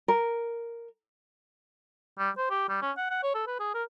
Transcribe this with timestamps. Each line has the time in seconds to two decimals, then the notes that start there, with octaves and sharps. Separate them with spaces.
0.08 A#4
2.18 G3
2.37 C5
2.50 G4
2.69 G3
2.82 C#4
2.97 F#5
3.10 F#5
3.23 C#5
3.35 A4
3.47 B4
3.59 G#4
3.74 A#4